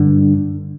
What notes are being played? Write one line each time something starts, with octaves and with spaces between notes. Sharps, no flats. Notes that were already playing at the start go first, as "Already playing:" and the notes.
Already playing: G2 D3